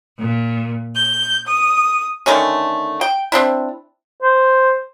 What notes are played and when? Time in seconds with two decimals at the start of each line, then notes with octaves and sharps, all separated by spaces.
0.18 A#2
0.96 G6
1.45 D#6
2.26 D3 D#3 A3 C#4
3.01 G5
3.32 C4 D4 E4
4.22 C5